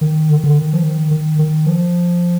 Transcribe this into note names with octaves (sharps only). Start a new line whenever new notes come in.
D#3
D3
D#3
D3
D#3
F3
D#3
D#3
D#3
F3